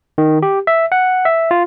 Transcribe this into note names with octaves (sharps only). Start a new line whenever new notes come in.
D#3
G4
E5
F#5
E5
F4